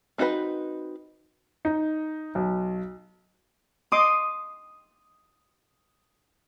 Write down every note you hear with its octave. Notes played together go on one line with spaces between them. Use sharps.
C4 D#4 F#4 G#4 B4
D#4
B1
D#5 C6 D6 D#6